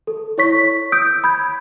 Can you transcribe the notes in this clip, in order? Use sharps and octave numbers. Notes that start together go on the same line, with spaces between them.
A4
E4 C#5 C#6 B6
D#6 E6 G6 D7
B5 G6 G#6